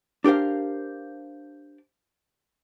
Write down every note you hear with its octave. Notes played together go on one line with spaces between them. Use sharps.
D4 G4 A#4 C5 F5